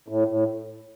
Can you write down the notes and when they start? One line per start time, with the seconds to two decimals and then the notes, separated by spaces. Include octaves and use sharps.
0.08 A2
0.28 A2